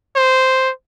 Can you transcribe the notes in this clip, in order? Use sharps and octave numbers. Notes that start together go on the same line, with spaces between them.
C5